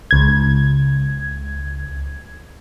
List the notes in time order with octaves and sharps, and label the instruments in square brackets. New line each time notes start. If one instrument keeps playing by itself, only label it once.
[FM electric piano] C#2 G#6